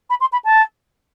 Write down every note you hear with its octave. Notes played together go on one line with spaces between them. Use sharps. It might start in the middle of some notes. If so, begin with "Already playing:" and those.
B5
C6
B5
A5